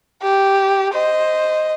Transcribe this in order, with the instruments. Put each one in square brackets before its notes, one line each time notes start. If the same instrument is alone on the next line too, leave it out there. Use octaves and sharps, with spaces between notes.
[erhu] G4
[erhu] C5 [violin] D#5